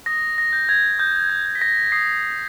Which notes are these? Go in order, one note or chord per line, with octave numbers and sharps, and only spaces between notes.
D#6 A#6
A#6
G6
G#6
D#6 G6
G#6
G6
B6
A#6
D#6 C7